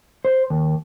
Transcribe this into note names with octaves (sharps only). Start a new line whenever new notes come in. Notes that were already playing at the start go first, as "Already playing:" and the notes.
C5
D#2